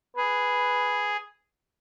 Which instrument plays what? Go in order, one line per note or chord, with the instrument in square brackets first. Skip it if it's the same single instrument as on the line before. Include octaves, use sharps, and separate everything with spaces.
[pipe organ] G#4 [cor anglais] B4